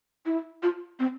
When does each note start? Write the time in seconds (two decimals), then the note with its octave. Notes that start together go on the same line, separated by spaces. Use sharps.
0.26 E4
0.63 F4
0.99 C4